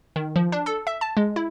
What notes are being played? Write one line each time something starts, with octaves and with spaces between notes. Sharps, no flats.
D#3
F3
D4
A4
E5
A5
G#3
E4